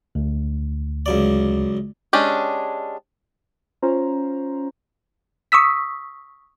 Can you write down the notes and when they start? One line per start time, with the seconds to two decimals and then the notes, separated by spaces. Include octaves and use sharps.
0.15 D2
1.06 C#2 F#2 D5
2.13 G#3 C#4 D4 G4
3.82 C#4 F4 C5 A#5
5.52 C#6 D#6 E6 B6